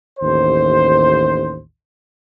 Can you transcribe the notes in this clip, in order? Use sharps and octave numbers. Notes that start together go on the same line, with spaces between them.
A1 D#2 C5